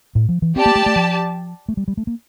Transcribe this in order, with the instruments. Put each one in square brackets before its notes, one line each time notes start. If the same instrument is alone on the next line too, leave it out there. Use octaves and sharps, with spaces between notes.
[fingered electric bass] A2
F3
E3
[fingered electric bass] C4 [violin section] G4 D5 A5
[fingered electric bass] A#3
A3
A3
F3
A3
G3
G3
A3
A#3